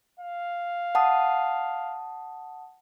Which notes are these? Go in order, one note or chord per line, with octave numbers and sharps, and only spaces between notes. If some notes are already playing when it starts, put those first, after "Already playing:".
F5
F#5 A5 D#6